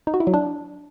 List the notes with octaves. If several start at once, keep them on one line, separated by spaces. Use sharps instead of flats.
D#4
F#4
E4
F#3
D4